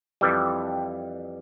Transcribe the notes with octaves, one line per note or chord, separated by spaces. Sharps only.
F2 E3 G3